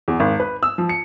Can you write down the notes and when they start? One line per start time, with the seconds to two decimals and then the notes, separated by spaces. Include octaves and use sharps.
0.08 E2
0.20 G#1
0.40 B4
0.63 E6
0.78 F3
0.89 C#7